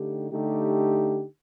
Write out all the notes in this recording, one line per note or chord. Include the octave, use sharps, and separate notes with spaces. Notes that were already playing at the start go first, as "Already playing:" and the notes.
Already playing: D3 A3 D#4 G4
D3 A3 D#4 G4